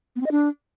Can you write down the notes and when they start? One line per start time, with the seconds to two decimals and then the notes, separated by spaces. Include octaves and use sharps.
0.16 B3
0.21 C4
0.26 D#5
0.31 D4